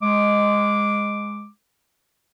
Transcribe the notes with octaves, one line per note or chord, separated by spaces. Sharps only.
G#3 D6